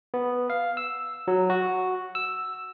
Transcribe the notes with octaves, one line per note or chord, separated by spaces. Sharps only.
B3
F5
E6
F#3
F#4
E6